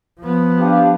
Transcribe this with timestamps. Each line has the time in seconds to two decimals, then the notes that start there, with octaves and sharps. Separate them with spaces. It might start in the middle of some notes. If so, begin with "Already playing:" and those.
0.20 F3 B3
0.59 D4 G4 F5